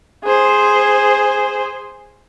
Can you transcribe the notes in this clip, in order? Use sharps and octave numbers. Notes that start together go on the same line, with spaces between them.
G#4 C5